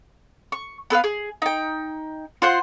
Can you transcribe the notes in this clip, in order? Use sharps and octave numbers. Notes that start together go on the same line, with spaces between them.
C#6
B3 A4 B4 F5
G#4
D#4 G5
F4 C5 F#5 C6